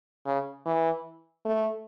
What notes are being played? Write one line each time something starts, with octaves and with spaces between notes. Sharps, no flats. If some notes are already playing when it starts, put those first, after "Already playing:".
C#3
E3
A3